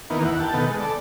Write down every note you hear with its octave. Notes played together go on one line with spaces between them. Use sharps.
D#3 E3 A#3 B3
D#2 E4 F#5
G4 A5
B2 D#3 B3 A4
G#3
A4 D5